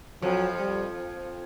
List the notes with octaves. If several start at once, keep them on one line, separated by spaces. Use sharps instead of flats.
F2 F3 F#3
G3